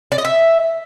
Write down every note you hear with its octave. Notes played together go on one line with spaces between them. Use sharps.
D5
D#5
E5